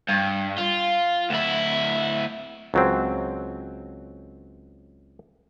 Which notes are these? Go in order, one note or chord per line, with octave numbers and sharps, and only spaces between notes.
G2
F4
D2 E4
C#2 F#3 C4